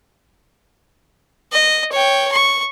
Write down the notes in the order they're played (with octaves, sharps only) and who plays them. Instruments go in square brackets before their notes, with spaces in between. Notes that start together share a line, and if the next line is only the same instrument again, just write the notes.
[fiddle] D#5
C#5 G5
C#6